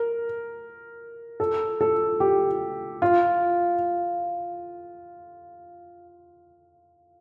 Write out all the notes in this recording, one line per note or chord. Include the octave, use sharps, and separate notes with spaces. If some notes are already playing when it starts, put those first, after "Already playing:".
Already playing: A#4
A4
A4
G4
F4